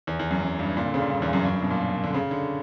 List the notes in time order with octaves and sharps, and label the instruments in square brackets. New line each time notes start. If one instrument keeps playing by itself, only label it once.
[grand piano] E2
E2
F#2
F#2
G2
A#2
D3
C#3
A#2
G2
E2
F#2
F#2
G2
B2
A#2
D3
C#3
D3